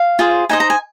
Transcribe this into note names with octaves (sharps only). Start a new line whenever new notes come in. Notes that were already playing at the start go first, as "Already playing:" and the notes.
Already playing: F5
F4 G#4 C5
D#4 C5 D#5 G#5
A#5
G#5